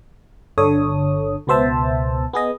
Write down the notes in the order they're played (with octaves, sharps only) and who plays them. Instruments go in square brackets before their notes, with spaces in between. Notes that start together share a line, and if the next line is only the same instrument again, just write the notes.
[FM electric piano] G1 D3 A4 C#5 D#6
C#2 B2 B3 C5 E5 A5
B3 G#4 D#5